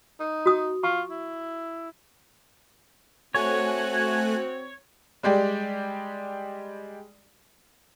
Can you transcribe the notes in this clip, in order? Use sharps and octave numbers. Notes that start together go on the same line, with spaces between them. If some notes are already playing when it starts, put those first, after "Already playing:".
D#4
F#4 D#6
F4 C#6
E4
A3 C4 F#4 C#5 G#5 F#6
G3 G#3 G4 D5